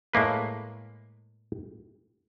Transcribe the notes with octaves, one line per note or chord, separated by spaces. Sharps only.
A2 G#3 A#3 B4